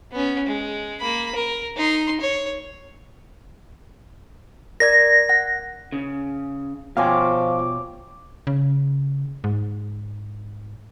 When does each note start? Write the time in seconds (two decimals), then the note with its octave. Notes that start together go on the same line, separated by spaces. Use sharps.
0.12 B3 C#4
0.46 G#3
1.00 A#3 B5
1.35 A#4
1.77 D#4 C6
2.21 C#5
4.80 A#4 D5 G#6 A#6
5.29 F#5
5.92 C#3
6.97 B2 F3 C5 C#5 F5 G5 G#5 D6
8.47 C#3
9.44 G#2